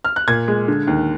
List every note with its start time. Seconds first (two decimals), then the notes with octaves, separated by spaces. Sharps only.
0.05 F6
0.16 F#6
0.27 A#2 G#6
0.48 G#3
0.68 D3
0.87 D#2